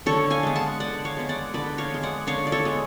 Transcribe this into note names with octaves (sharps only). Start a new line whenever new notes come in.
D3 A4 C#5
F5 G#5
G#3 B3
F#5 A5
D3 D5 F#5
C#5 F5
G#3 B3
D5 F#5
D3 B4 D5
C#5 F5
G#3 B3
D5 F#5
D3 C#5 F5
D5
A4 C#5
G#3 B3